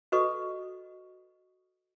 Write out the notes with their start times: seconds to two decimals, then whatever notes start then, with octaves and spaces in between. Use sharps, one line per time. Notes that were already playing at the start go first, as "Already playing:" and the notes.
0.12 F#4 A4 B4 D#5 C#6